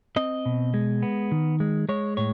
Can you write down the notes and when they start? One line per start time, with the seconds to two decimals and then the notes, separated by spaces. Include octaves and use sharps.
0.17 C4 D#5
0.46 B2
0.74 G#3
1.03 B3
1.32 D#3
1.60 G#3
1.89 G#3 C#5
2.17 A2 C#5